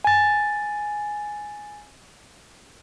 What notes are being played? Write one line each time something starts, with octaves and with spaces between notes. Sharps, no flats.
G#5 A6